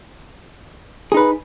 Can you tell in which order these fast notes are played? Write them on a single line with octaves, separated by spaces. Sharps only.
G#4 D#4 B4